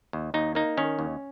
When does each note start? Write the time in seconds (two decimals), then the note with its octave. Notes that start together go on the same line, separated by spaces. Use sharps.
0.13 D#2
0.34 D#2 D#4
0.55 A#3 D#4
0.77 D#3 C#4
0.99 D#2